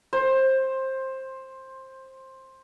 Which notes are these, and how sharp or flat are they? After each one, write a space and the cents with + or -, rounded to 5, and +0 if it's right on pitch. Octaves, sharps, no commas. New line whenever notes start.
C5 +15